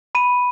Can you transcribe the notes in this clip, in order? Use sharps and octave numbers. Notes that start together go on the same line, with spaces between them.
B5 D#7